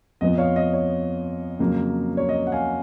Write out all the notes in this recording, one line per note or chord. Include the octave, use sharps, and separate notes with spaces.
F2 F3 B3 D#5
C#5 F5
D#5
C#5
F2 C#3 F#3 A#3
C#5
D#5
F#5
F5 G#5